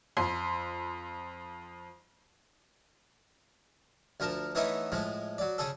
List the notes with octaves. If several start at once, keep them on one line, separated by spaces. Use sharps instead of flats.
F2 C6
D2 F3 A#4 A5
E3 A3 B3 C#4 D#4 E4
A2 F3 G#3
F#3 D5
C#3 G#4 A4